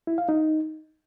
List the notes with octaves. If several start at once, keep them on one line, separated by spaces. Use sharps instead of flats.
E4
F5
D#4